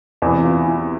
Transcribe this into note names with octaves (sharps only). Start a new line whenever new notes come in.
E2 C3 E3
E4
F4
E4